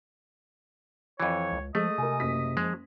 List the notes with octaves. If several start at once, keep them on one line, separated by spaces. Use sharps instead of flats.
F2 E3 C#5
C#2
F3 G#3 A3 D#5
C3 A#4 G#5
F#1 B6
F3 G#3